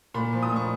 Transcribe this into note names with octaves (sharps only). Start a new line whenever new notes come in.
A#2 B5
F3
D#6
A#2 C#6